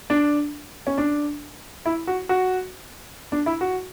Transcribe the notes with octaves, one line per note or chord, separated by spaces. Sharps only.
D4
C#4
D4
E4
F#4
F#4
D4
E4
F#4